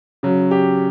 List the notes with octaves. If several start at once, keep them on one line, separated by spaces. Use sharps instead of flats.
C#3 F#3
G4